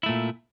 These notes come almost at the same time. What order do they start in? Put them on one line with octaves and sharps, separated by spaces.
E4 A3 A#2